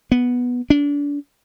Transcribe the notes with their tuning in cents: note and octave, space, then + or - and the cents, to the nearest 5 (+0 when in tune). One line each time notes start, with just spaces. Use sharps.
B3 -5
D4 -30